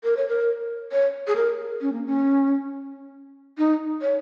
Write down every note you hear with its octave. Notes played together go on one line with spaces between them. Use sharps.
A#4
C#5
A#4
C#5
G#4
A#4
C#4
A#3
C#4
D#4
C#5